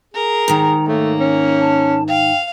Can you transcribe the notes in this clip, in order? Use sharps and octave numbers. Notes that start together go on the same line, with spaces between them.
G#4 A#4
G#2 D#3 A#5
A3 A#3 C#5
C#4
A5
F5 G5